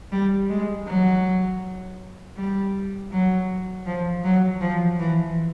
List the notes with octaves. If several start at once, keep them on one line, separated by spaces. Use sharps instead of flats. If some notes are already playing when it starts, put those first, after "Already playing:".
G3
G#3
F#3
G3
F#3
F3
F#3
F3
E3